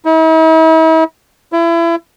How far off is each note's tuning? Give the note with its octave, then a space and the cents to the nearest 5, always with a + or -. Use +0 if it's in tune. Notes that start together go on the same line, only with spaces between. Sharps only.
E4 -45
E4 +30